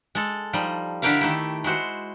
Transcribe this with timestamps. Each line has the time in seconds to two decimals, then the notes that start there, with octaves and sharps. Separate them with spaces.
0.15 G#3 A4
0.53 F3 G3 D#4
1.02 D3 D4 E4 G4 A#4 F5
1.21 D#3 A3 E4
1.64 G#3 E4 F#4 C5